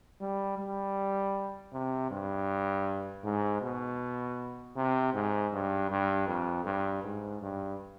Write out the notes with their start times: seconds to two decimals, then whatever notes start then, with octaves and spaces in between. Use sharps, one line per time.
0.20 G3
0.58 G3
1.72 C3
2.11 G2
3.24 G#2
3.62 B2
4.76 C3
5.14 G#2
5.52 G2
5.90 G2
6.27 F2
6.65 G2
7.03 G#2
7.42 G2